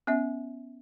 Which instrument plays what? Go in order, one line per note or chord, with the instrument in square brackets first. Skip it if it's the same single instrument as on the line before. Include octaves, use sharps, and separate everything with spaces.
[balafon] B3 C#4 E5